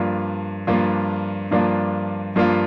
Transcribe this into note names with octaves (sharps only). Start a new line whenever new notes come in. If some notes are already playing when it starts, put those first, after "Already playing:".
Already playing: G2 F3 A#3 D4 F4
G2 F3 A#3 D4 F4
G2 F3 A#3 D4 F4
G2 F3 A#3 D4 F4